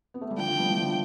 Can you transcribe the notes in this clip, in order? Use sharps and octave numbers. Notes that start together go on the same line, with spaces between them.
B3
A3
G3
D3 F3 G5
D3 F3
G3 B3
E3 G3
D3 F3